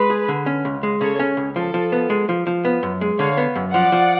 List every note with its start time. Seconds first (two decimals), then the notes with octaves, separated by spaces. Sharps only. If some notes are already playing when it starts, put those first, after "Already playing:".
Already playing: G#3 B4
0.10 G#4
0.28 D3
0.46 C#4
0.65 C#2
0.83 G#3
1.01 C#3 A4 C#5
1.20 C#4
1.37 C#2
1.56 F3 A4
1.74 F3
1.92 B3
2.10 G#3
2.29 F3
2.47 F3
2.65 B3
2.83 F#2
3.01 G#3
3.19 D3 C#5 F5
3.37 B3
3.56 F#2
3.73 F3 D5 F#5
3.92 F3